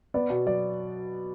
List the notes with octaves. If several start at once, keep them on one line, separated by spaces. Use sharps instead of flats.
B3 D5
B2
F#3 D5